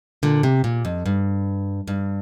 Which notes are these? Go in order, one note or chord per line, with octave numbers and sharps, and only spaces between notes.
A#2 D3
C3
A#2
F2
G2
G2